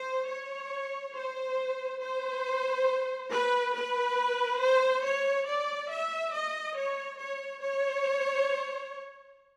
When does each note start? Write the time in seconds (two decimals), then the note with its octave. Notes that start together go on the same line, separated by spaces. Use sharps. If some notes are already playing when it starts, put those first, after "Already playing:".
Already playing: C5
0.30 C#5
1.15 C5
2.02 C5
3.31 B4
3.75 B4
4.61 C5
5.05 C#5
5.47 D5
5.91 E5
6.34 D#5
6.77 C#5
7.21 C#5
7.63 C#5